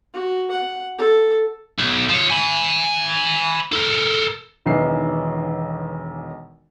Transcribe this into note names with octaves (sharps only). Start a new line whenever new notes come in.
F#4
F#5
A4
B1
F3 C#5
G#5 B5
A4 A#4
E1 B1 D#3 E3 C7